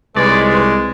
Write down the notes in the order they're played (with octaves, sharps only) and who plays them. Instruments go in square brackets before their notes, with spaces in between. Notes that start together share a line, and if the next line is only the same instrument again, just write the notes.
[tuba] C2 [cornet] G#3 [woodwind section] D#4 F4 B4 [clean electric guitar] C#5 D5